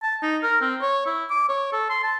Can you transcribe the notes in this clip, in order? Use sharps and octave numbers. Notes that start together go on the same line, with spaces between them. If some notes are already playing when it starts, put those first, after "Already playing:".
A5
D#4
A#4
C4
C#5
E4
D6
C#5
A4
C6
A5